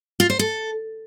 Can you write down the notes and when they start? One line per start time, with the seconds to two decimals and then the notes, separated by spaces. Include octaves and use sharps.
0.20 F4
0.30 C5
0.39 A4